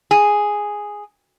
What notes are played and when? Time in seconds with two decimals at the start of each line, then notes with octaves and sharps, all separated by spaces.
0.11 G#4